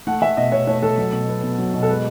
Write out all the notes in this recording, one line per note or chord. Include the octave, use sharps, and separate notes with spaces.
A3 F#5
A3 E5
B2 D#5
B2 C#5
A3 C#5
A3 A4
F#3
B2
B3
B2
F#3
B2
A4
G#3 B4